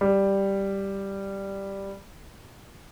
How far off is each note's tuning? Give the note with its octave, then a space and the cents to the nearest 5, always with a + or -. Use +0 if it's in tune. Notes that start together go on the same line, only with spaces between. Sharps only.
G3 +0